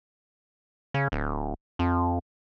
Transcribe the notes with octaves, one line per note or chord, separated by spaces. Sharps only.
C#3
D1
F2